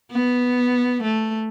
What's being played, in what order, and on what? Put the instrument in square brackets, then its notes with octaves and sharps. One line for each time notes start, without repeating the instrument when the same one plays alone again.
[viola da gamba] B3
A3